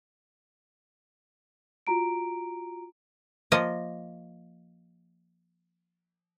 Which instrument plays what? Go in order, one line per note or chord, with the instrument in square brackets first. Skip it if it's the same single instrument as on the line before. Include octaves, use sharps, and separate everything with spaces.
[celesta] F4 F#4 A#5 D7
[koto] F3 A#3 D#5